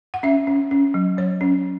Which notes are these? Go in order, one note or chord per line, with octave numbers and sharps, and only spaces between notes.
F#5
C#4 E5
C#4
C#4
F#3
F#3 C#5
C#4